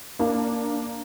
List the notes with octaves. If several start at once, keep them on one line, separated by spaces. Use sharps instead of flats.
A#3 D4